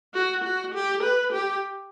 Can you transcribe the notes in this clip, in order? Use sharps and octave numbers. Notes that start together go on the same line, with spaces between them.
F#4
F#4
G4
B4
G4